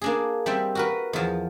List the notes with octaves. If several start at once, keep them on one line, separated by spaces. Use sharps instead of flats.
A#3 D4 G#4
G3 C4 E5 G5
F#4 A#4 B4
E2 F3